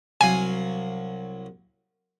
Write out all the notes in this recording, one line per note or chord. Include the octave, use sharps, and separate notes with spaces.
C2 F#3 F5 G#5